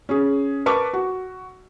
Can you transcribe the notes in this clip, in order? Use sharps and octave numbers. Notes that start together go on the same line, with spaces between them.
C#4 G#4
A#4 B4 A5 C#6 D6
F#4